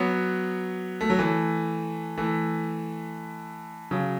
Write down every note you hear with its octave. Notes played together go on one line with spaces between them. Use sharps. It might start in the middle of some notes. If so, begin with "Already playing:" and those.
Already playing: F#3 B3
A3
F#3
E3 A3
E3 A3
C#3 F#3